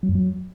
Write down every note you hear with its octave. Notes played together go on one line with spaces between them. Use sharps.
F#3
F#2
F#3